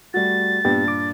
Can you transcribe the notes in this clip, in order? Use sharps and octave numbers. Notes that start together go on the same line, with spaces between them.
G3 A3 F#4 A6
G2 A#2 B3 G4
D6